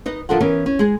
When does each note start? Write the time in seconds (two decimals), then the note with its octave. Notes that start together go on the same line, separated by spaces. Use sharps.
0.06 D#4 B4 D#5
0.29 D3 F3 D4 A4 A#4 F#5
0.41 E3 B3 C#4 A#4
0.66 C#4
0.79 G#3 G#4